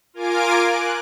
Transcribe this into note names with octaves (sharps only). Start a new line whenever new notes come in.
F4 A#4 G#5 D6 D7
F#6